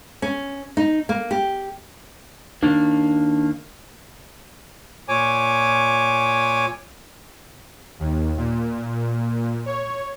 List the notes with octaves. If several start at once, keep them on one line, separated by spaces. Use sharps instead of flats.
C#4
D#4
A#3
G4
D#3 A#3 D4
A#2 C#5 G#5 D6
D#2
A#2
C#5